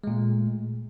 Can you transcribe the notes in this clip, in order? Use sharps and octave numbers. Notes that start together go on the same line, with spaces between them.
A#2 G#3 A3